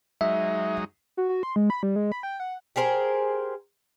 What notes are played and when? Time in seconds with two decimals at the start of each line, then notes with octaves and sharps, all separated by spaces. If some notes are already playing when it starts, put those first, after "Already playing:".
0.21 F#3 G#3 D#4 E5
1.17 F#4
1.29 F#4
1.43 C6
1.56 G#3
1.70 B5
1.83 G3
1.96 G#3
2.12 B5
2.23 G5
2.40 F#5
2.76 G4 G#4 A#4 C5